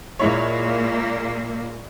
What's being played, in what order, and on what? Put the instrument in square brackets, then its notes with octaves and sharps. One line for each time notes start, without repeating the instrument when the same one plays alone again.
[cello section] A#2 A#3 [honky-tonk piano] G#3 E4 C#5